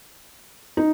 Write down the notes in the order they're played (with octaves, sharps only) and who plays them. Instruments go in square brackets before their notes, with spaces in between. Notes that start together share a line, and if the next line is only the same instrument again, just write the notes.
[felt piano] D#4